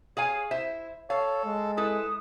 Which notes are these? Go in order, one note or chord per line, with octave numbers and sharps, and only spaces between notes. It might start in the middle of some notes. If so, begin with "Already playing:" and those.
G#4 C#5 F5 G#5
E4 C5 E5
A4 C#5 F5 A5
G#3
E4 A4 B4 D#6